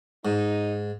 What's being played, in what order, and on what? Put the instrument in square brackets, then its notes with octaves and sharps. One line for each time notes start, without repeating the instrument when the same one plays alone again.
[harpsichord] G#2 [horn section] D#4